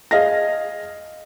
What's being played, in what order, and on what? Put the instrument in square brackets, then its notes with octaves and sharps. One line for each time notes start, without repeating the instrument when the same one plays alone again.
[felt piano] G#4 D#5 F5 A#6